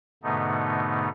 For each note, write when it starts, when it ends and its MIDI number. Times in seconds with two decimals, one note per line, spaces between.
0.23 1.09 44
0.23 1.09 47
0.23 1.09 50
0.23 1.09 57
0.23 1.09 59
0.23 1.09 63